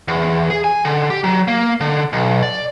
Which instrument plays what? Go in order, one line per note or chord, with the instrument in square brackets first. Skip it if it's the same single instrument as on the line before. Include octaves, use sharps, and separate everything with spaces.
[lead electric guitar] E2
G#4
G#5
D3
G4
F#3
A#3
D3
B1
D5